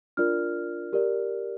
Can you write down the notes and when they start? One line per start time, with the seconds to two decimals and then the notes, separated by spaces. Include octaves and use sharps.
0.17 D4 F4 A#4 D5 F6
0.93 G4 A#4 D5